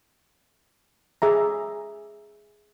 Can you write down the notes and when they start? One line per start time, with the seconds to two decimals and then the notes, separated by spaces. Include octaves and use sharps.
1.22 G#4 E5 A#5